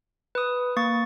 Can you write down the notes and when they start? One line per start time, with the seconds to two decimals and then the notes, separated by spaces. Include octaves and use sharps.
0.35 B4 D#6
0.77 A#3 C#6 A6